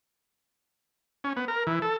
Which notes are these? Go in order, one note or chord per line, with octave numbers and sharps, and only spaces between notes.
C#4
B3
A#4
E3
A4